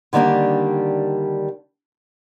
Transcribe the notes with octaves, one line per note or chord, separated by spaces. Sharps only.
D3 D#3 G3 A#3 D4